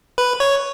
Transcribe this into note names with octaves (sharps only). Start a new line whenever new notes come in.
B4
C#5